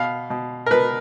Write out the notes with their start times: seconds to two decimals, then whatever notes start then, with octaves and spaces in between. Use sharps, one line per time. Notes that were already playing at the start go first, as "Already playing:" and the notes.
Already playing: B2 F5
0.30 B2
0.66 A#4
0.71 B2 B4